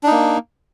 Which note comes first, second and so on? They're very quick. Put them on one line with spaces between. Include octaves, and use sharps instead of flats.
D4 D#4 A#3